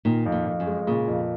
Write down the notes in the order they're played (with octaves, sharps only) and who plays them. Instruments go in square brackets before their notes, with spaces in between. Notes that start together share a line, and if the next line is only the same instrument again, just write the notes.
[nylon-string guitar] A#2 [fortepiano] D#3
[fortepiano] F2
[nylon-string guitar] A#2
[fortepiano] F2
[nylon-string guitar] F#2
[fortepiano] G#3
[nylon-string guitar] A#2 [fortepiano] C#3
[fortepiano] F2